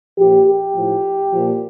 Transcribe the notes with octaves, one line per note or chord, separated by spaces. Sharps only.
A#2 F3 G4
G4
A2 F3
A#2 F3